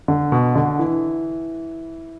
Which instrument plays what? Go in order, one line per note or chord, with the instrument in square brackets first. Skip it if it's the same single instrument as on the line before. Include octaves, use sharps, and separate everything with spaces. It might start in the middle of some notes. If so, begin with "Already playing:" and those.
[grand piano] D3
B2
D3
E3